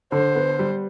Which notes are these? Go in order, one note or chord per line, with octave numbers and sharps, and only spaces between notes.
D3 C5
B3
G3